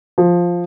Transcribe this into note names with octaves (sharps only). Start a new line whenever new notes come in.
F3